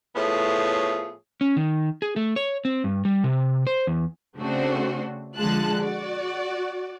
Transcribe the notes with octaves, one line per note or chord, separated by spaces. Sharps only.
A2 F3 A3 B3 G#4 C#5
C#4
D#3
G#4
A3
C#5
C4
G2
G3
C3
C5
E2
C#3 A3 C4 D4 F#4 C5
D3 F3 G#3 F4 A5 F#6
F#4 D5